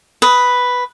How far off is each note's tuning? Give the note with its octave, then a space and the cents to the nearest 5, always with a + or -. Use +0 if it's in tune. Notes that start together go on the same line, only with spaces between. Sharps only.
B4 +0 D#6 +10